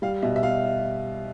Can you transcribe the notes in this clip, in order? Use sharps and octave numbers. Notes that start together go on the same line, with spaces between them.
G3 F5
B2 E5
E5
B2 F5